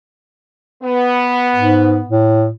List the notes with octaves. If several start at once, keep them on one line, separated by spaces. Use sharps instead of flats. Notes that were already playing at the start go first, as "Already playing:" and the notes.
B3
G#2
A2